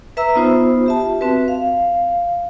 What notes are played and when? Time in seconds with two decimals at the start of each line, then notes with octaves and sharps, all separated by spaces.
0.17 B4 E5 A#5 E6
0.35 B3 D#4 F4 C5
0.86 G4 E5 A5
1.21 C4 F#4 B4
1.48 F5